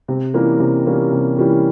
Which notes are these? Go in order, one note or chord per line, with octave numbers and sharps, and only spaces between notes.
C3
E3 G3 A#3 C#4
C3
E3 G3 A#3 C#4
C3
E3 G3 A#3 C#4